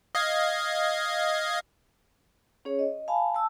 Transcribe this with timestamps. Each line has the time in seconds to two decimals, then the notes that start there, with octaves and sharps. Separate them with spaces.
0.15 D#5 F5 G#6
2.65 C#4 G#4 C#5
2.79 D#5
3.08 F5 G#5 A5 B5
3.35 A5 E6